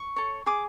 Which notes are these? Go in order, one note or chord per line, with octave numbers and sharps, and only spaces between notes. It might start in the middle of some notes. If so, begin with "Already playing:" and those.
Already playing: C#6
A4 C#5
G#4 D6